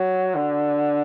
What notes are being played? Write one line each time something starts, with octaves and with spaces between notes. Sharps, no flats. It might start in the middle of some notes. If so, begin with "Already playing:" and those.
Already playing: F#3
D3